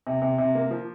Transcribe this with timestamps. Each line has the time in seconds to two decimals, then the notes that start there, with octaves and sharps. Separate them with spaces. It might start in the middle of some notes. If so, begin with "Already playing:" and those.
0.07 C3
0.22 C3
0.38 C3
0.55 A#3
0.71 F3